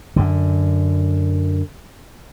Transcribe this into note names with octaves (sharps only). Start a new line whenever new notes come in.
F#2 D3